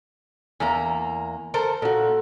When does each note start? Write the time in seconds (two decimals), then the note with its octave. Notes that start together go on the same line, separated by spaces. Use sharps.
0.60 E2 A#3 G#5 A#5
1.54 A4 A#4 C5
1.82 A#2 F#4 A4